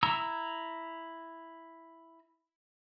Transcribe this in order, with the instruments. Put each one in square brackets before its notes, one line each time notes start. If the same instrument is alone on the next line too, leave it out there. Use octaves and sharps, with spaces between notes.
[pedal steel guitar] E4 A#5 E6